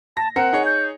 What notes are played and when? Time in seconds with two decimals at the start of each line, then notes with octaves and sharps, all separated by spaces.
0.17 A5 A#6
0.36 C4 A#4 F#5 C#7
0.53 D#4 G#4 C#5
0.66 G6